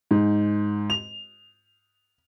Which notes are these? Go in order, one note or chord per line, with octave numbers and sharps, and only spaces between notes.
G#2
F7